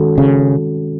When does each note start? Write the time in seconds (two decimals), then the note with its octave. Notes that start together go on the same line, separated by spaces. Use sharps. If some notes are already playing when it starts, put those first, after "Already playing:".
Already playing: D#3 G#3 C#4 F#4 A4
0.18 C#3